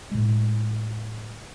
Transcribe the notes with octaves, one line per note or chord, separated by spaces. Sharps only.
A2 G#3